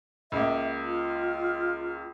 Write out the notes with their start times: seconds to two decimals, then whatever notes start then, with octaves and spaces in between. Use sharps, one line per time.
0.32 C#2 A#3 E5
0.83 F4